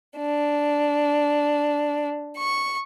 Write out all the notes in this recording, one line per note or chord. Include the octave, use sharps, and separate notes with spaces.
D4
C#6